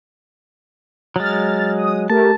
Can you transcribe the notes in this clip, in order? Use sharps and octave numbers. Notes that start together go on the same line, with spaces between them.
F#3 G#3 F6 A6
D#6
A3 G4 A#4 A5